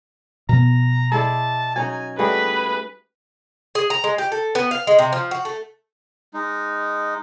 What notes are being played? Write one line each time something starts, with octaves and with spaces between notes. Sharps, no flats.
B2 F3 B3 A#5
G#3 E4 D5 A5
F#3 C#4 D#4 G#5
G3 A3 F#4 G#4 B4 B5
G#4
A#5
G#3
G4
A4
B3
F5
G#3
C3
F3
F#4
A3
G#3 D#4